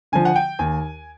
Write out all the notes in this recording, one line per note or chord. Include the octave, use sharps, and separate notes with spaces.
D3 F3 G#5
F#5
G5
D#2 G#5